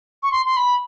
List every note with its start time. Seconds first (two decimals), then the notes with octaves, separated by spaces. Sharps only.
0.23 C#6
0.32 C6
0.46 C6
0.57 B5